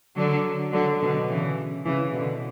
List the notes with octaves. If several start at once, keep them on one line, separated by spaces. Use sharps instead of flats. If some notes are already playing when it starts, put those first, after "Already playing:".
D3 F#3
D3 F#3
B2 D3
C#3 E3
C#3 E3
B2 D3